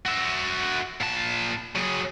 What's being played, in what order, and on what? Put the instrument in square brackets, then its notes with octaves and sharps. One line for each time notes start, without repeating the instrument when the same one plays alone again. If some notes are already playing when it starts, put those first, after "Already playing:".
[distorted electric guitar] F#4 E5
A#2 A5
F#3 G#4